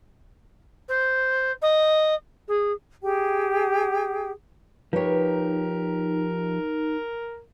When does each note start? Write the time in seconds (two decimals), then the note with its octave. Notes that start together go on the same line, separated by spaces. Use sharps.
0.89 C5
1.62 D#5
2.48 G#4
3.03 G4 G#4 G5
4.93 F3 D#4 G4 A#4 B4 C#5